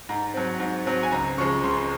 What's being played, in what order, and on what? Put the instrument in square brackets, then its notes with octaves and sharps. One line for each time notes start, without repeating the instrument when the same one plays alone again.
[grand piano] G#2 A#5
F#3 C4
G#2
F#3 C4
G#5
C#2 A#5
C#3 F3 G#3 C#6
C#2 C6